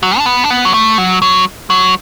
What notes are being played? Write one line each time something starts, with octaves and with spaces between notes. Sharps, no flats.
F#3
D4
B3
D4
B3
F#3
A3
F#3
F#3
F#3